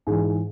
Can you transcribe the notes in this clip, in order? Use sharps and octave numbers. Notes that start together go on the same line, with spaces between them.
G#2 E3 G#4